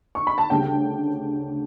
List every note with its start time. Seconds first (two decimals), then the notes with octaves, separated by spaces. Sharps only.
0.15 C#6
0.27 B5
0.38 A5
0.50 D2 C#3 G3 G5